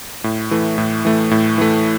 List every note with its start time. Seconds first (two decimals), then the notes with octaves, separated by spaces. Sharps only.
0.24 A2
0.51 E3 A3
0.78 A2
1.05 E3 A3
1.31 A2
1.58 E3 A3